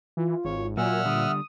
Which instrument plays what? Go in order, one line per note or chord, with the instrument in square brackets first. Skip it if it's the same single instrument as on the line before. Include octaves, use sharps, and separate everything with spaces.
[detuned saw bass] E3 [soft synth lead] F4
[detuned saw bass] G#1 [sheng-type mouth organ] C#5
[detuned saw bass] A#2 [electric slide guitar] F#3 [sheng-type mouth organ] E5 F#5 F6 [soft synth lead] G#5
[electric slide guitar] D3 G3 [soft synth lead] D#6